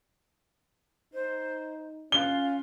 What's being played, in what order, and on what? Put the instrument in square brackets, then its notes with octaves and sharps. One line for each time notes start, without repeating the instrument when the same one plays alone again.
[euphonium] D#4 [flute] C5
[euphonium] C#4 [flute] F4 [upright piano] G7